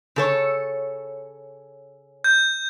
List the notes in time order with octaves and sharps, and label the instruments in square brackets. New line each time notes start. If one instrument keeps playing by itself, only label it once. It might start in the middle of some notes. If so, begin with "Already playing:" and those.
[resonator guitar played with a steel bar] C#3 A4 C#5
[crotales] G6